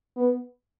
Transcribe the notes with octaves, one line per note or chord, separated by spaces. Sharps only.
B3